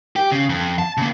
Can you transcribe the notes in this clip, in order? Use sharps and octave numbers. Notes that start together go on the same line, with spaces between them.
G4
C#3
F2
A5
C#3 A#3